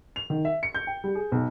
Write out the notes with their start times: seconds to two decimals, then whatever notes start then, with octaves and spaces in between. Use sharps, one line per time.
0.16 F7
0.30 D#3
0.45 E5
0.63 C#7
0.74 G6
0.87 G5
1.04 G3
1.15 G#4
1.32 B1